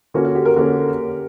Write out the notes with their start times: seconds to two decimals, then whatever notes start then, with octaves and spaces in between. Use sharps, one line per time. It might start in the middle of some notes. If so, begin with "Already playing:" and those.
0.14 D3 A#3 C#4 F#4
0.25 F#4
0.35 G4
0.45 A#4
0.56 D3 A#3 C#4